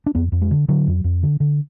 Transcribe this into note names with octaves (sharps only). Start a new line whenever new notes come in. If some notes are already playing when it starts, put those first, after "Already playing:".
D4
F2 B3
F2
G#3
D3
D3 F#3
F2
F2
D3
D3